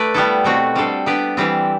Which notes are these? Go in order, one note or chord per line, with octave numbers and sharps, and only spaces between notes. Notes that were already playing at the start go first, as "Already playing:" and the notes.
Already playing: A3 B4 D5
G3 B3 E4 A4
B2 A3 C4 F#4
G3 D4 A4 C5
B3 D4 G4 B4 D5
E3 G3 C4